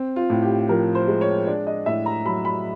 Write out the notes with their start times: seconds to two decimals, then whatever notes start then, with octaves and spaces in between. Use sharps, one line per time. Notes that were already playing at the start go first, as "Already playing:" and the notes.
Already playing: C4
0.16 F4
0.30 A2
0.42 G4
0.69 F3 A#4
0.95 C5
1.08 G#3
1.21 C#5
1.47 D4 D5
1.67 D#5
1.86 A2 E5
2.06 A#5
2.25 F#3 B5
2.45 B5